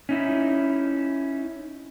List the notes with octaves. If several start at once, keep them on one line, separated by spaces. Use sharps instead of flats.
C#4 D#4 E4